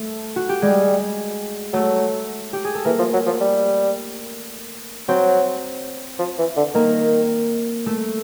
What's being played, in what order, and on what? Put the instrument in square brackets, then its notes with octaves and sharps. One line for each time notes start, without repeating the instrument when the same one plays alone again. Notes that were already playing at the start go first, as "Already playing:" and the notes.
Already playing: [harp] A3 A4
F#4
G4
[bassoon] G3 [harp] G#3 G#4
[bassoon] F#3 [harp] A3 A4
[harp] G4
G#4
A4
[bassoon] E3 [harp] A#3 A#4
[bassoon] F3
F#3
F3
G3
[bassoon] F#3 [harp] C4 C5
[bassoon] F3
E3
D3
[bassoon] D#3 [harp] A#3 A#4
[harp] A3 A4